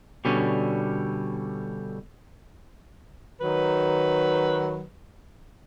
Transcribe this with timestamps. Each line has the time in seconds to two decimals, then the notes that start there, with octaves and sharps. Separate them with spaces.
0.25 B2 D3 G3 C#4
3.41 D#3 F#3 B4